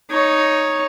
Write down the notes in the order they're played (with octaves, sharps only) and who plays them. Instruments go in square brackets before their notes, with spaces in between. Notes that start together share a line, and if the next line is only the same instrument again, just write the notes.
[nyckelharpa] D#4 C#5